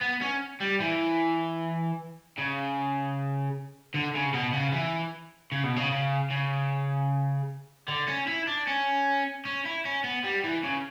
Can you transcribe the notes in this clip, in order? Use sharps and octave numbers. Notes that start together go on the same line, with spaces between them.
B3
C#4
G3
E3
C#3
D3
C#3
B2
C#3
E3
C#3
B2
C#3
C#3
C#3
D3
C#4
E4
D4
C#4
C#4
E4
C#4
B3
G3
E3
C#3